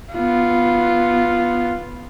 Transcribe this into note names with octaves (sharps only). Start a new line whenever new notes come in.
B3 F4